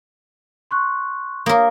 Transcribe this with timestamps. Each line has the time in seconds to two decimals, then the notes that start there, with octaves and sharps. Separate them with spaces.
0.71 C6 C#6 F#6
1.46 A#3 A#4 C#5 D#6